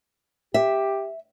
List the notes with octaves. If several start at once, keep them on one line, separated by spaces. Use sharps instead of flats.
G4 E5